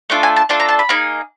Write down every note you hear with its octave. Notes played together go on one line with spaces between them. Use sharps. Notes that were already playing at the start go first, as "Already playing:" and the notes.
A3 D4 F4 A4
G#5
A5
A3 D4 F4 A4 A5
A#5
A5
B5
A#3 D#4 G#4